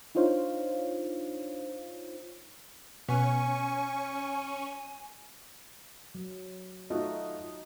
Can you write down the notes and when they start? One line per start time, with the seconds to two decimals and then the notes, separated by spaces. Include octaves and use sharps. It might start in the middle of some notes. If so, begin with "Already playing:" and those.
0.15 D4 D#4 F4 C5 C#5 F5
3.09 B2 C#4 G#5 C#6
6.15 F#3
6.90 A3 D#4 F4 F#4 D#5